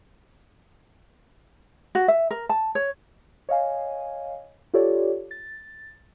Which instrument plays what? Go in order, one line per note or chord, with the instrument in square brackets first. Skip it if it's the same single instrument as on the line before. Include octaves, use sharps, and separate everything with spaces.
[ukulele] F#4
E5
A#4
A5
C#5
[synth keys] C#5 D#5 F5 G#5
F4 G4 A4 C#5 D5
A6